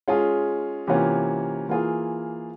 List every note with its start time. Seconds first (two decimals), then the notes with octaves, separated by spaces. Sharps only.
0.08 G#3 C#4 F4 G#4
0.87 C3 E3 A#3 C#4 F4
1.69 E3 A#3 F4 G#4